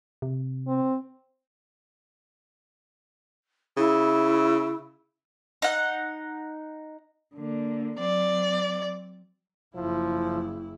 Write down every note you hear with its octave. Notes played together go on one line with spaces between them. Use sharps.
C3
C4
C#3 E4
D#4 F#5
D3 A#3
F#3 C4 D5
F#1 F3 E4